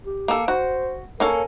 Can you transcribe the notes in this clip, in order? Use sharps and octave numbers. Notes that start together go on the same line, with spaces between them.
G4
A#3 A4
F#4 C5
A#3 C#4 A4 A#4